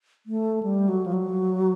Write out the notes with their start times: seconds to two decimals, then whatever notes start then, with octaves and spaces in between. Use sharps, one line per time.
0.26 A3
0.63 G3
0.88 F#3
1.06 F3
1.13 F#3